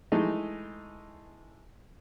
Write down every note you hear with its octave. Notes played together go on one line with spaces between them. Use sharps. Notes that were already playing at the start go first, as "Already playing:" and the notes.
E3 G#3 A3 D#4